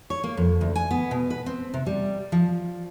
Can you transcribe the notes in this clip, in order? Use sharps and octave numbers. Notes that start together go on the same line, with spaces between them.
C#5
A#3
F2
D2
G#5
B3
B2
B4
C4
C3
G3
F3